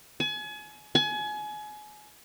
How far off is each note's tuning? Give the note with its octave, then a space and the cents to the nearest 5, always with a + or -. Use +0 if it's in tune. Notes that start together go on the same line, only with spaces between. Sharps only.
G#5 +35
G#5 +30